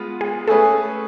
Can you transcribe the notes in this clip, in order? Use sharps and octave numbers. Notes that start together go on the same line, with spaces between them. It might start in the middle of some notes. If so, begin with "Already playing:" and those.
Already playing: G#3 B3 F4
G#4
A3 C#4 G#4 A4 B4